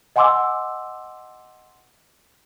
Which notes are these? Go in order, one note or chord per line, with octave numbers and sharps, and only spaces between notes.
D#5 F#5 G#5 C6 D6 E6